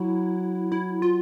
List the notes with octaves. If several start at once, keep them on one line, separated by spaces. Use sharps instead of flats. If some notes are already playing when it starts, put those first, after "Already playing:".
Already playing: F#3 E4
E4
F4